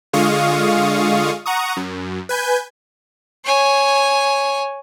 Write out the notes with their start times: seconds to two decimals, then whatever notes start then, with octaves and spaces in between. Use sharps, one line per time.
0.13 D3 G#3 F4 F5 C#6 D#6
1.46 F#5 A#5 C#6 D#6
1.77 F#2
2.29 B4 G#5 G6
3.45 C#5 G#5